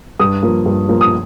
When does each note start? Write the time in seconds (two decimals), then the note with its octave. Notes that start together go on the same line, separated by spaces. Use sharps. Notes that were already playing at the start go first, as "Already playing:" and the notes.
0.20 G2 D#6
0.43 F3 A#3
0.66 G2
0.89 F3 A#3
1.01 D#6